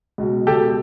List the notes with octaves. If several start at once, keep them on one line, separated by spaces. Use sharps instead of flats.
C#2 B2
C#2 B2 G4 A4